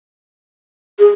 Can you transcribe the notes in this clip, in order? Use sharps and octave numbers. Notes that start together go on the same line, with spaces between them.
G#4